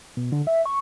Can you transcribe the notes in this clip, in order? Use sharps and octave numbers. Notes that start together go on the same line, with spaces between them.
B2
D3
E5
C#6